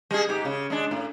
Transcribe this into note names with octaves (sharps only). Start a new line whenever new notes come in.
G3 G#4
G#2 G4
C#3
G#3 D4
A2